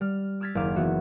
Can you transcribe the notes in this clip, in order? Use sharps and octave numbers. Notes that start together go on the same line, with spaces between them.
G3 F6
D6 E6 F6 G#6 A6 B6
F#1 D#2 F5 D6 E7
E3 B3 D#4 F#4 E5